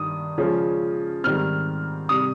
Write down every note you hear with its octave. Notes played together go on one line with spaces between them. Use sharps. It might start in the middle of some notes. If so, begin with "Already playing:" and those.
Already playing: G2 D#3 D#6
C#3 F3 G#3 C#4
G#2 D#3 G3 C4 F6
C3 G3 D#6